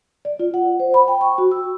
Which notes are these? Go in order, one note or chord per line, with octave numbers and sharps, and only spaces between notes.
D5
F4
F#5
C5
B5
G5
C#6
F#4
E6